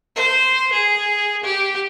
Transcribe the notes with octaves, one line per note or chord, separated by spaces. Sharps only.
C5
G#4
G4